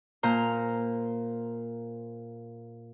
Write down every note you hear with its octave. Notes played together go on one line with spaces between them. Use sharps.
A#2 C5 A#5 F6